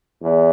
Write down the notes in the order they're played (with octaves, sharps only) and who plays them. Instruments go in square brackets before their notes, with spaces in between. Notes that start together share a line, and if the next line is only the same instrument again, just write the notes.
[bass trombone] E2